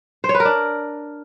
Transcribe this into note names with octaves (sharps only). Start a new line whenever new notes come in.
C5
C#5
B4
A#4
D4